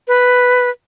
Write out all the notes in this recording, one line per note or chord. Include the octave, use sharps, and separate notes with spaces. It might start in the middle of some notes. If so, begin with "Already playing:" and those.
B4